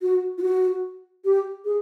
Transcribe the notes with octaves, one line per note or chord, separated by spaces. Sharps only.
F#4
F4
F#4
G4
G#4